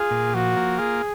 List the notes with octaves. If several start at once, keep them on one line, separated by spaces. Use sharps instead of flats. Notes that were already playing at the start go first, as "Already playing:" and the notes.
Already playing: F4 G#4
A#2
F3 F#4
A#3
F4 G#4